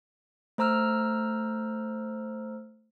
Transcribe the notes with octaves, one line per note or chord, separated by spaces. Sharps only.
A3 C5 A#5 E6 F6